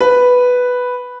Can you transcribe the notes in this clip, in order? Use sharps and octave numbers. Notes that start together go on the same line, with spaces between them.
B4